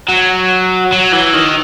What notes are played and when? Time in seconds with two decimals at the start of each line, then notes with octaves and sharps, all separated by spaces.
0.08 F#3
0.92 F#3
1.13 E3
1.34 D#3